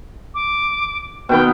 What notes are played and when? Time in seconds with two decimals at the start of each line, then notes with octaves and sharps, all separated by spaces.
0.35 D6
1.29 B2 D#3 B3 G5